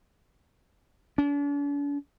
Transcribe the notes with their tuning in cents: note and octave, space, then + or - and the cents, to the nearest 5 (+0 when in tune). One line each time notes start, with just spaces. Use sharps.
D4 -45